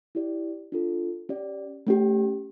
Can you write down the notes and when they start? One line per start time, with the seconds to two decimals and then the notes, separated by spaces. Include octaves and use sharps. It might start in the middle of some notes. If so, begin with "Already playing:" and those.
0.15 E4 G4 D5
0.72 D4 F4 A4
1.29 C#4 G4 D5
1.87 A3 C#4 G4